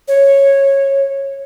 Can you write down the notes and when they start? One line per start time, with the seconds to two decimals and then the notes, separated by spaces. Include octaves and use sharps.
0.08 C#5